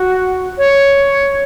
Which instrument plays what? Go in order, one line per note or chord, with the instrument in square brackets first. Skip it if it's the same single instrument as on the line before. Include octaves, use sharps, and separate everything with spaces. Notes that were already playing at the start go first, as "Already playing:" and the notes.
Already playing: [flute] F#4
C#5